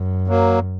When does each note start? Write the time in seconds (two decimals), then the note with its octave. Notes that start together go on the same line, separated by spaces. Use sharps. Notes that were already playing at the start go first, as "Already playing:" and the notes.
Already playing: F#2
0.28 F#3 A#3